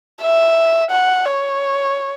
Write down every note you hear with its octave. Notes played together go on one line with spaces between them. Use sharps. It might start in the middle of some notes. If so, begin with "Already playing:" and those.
E5
F#5
C#5